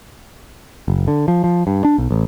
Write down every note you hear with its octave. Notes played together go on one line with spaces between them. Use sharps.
F#1
D3
F3
F3
G2
D4
B1
A1